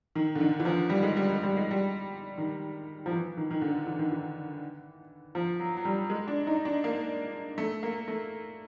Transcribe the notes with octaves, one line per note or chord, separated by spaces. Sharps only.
D#3
D3
D#3
E3
F3
G3
G#3
G3
G#3
G3
G#3
G3
D#3
F3
E3
D#3
D#3
D3
E3
D#3
E3
F3
F#3
F#3
G3
G#3
D4
D#4
D4
A#3
A3
A#3
A3